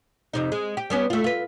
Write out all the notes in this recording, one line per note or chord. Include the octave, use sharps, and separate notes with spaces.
F2 C3 D#4
G#3
G4
G3 B3 C#4
A3 F4
F4 B4